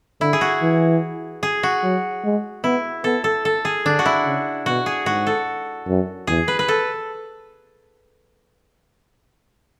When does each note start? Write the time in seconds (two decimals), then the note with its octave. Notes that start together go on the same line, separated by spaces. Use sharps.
0.21 D3 E4
0.33 G#4
0.41 F#4
0.62 E3
1.43 G#4
1.63 F#4
1.83 F#3
2.24 G#3
2.64 B3 E4
3.04 B3 A4
3.24 A4
3.45 A4
3.65 G#4
3.85 D3 D4
3.99 F#4
4.06 E4
4.25 C#3
4.66 B2 F#4
4.86 G#4
5.06 G#2 F#4
5.27 A4
5.87 F#2
6.27 E2 G#4
6.48 B4
6.59 B4
6.68 A4